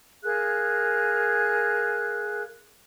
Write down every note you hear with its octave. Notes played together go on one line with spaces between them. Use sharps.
G#4 A#4 F5 F#6